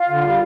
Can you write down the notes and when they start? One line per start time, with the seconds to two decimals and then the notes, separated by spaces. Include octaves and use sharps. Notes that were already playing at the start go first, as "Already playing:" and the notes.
Already playing: F4
0.09 D3
0.24 G3